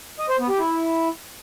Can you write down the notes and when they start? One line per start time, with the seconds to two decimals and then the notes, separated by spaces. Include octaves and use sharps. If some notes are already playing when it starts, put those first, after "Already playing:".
0.19 D#5
0.29 C5
0.39 B3
0.49 G4
0.59 E4